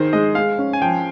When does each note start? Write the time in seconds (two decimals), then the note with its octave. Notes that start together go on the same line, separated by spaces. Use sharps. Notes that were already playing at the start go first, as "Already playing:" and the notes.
Already playing: D#3 G#4 A#4 C5
0.13 G#3 D#5
0.35 G#3 F5
0.59 C#4
0.73 G#5
0.82 F3 G5